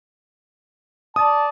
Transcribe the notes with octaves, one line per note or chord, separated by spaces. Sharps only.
D5 A5 D#6